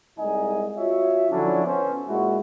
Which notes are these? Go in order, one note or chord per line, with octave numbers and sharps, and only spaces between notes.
C2 G#3 D#4 D#5 G#5
F4 F#4 C#5 E5
D3 F3 F#3 C#4 D4 E4
B3 C#4 C5
A#2 G#3 E4 F#4